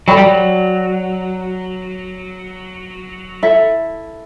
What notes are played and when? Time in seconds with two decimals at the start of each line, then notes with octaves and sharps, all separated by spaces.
0.08 F#3 A4 D5 G5 B5
0.17 G3
0.26 F#3
3.43 E4 A4 E5